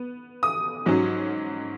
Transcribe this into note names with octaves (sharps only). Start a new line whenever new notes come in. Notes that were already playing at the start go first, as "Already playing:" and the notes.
Already playing: B3
D#6
G#2 F#3 C#4